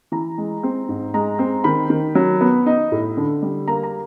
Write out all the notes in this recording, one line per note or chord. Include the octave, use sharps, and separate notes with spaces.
E3 A#5
G#3
C4
G#2
G#3 A#5
C4
D#3 B5
D#3
F#3
B3
D#4
A2
D3
G3
A#3 A#5
A#5